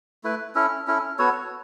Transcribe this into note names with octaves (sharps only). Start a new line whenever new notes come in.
A3 E4 B4
C#4 E4 A4
C#4 E4 A4
B3 F#4 A4 C#5